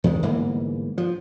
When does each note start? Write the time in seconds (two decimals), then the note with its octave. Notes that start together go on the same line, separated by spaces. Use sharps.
0.04 E2 D#3 G#3
0.23 G1 G#2 E3 A#3
0.98 F3